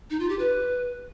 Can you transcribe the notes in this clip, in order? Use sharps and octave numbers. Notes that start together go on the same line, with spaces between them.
D#4
F4
G4
B4